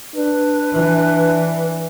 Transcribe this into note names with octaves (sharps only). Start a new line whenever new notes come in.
D4 B4
E3